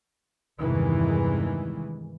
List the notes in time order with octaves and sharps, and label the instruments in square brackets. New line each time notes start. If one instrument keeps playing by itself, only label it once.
[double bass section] E2 G2 C3 D#3 E3 G#3